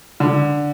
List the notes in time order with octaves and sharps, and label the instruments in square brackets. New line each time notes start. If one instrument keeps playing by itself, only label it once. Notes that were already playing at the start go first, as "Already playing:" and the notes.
[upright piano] D3